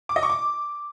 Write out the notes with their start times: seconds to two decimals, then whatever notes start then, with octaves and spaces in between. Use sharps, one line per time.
0.09 D6
0.16 D#5
0.23 C#6
0.30 D6